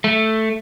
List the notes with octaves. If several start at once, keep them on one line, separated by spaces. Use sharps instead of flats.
A3